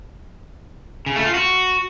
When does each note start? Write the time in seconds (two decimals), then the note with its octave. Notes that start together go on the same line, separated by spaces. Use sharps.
1.06 C#3
1.16 A3
1.25 F4
1.34 F#4